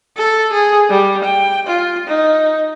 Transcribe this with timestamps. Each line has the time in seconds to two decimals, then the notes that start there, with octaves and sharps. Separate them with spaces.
0.17 A4
0.53 G#4
0.90 G3
1.24 G5
1.67 F4
2.07 D#4